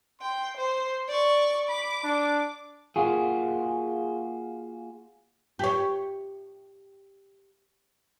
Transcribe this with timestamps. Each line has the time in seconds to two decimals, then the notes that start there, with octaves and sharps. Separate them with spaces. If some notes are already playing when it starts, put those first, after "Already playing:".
0.21 G5 C6
0.57 C5
1.08 D5 C#6
1.69 B5 D6
2.04 D4
2.96 A#3 F4 F#4 G#4
5.59 G4 C#5